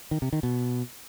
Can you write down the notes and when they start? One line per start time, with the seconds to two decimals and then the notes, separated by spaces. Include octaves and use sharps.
0.11 D#3
0.22 C3
0.33 D#3
0.43 B2